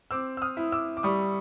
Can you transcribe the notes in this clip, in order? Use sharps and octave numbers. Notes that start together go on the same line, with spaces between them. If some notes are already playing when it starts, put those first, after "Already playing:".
C4 D6 E6
E6
D#6 F6
E4
D6 E6
D6
G3 C#6 D#6